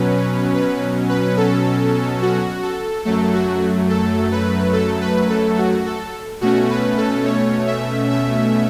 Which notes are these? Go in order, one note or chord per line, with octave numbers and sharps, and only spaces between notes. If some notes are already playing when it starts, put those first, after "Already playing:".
Already playing: B2 F#3 C#4 B4
B4
B4
A4
F#4
A4
F#2 F#3 A3 A4
F#4
A4
B4
A4
B4
A4
F#4
A4
B2 A3 C#4 F#4
B4
A4
C#5
E5
E5